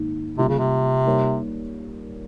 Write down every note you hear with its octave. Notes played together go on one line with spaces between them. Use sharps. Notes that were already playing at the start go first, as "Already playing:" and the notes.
Already playing: G#2 D#3 A#3 D#4
C3 G3 A#3 C#4 F4
C#3
C3
G3 A#3 D#4 A#4 C#5